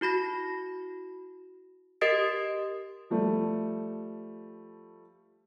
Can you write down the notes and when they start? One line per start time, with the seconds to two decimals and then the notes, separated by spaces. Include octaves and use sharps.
0.01 E4 F#4 B5 A#6
2.01 G4 A#4 D#5 D#6 A6 D7
3.10 F3 G3 A3